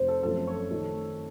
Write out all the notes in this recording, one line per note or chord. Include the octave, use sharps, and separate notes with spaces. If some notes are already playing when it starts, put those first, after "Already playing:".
Already playing: F1 C5
A4
F#2 F3 A3 C4 F4 A4
C#5
D#3 A3 D#4